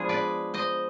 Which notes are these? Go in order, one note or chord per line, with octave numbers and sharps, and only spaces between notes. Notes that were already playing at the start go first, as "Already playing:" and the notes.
Already playing: F3 G#3 B3 D4 F4 G#4
B4 D5
C5 D#5